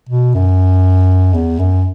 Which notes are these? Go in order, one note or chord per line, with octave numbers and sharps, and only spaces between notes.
B2
F#2
E2
F#2